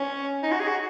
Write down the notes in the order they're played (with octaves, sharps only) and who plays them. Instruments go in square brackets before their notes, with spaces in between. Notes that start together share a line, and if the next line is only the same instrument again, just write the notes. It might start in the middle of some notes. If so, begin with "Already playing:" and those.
Already playing: [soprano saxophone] C#4
D#4
F#4
G#4
F#4